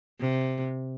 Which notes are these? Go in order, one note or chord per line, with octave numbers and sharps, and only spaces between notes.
C3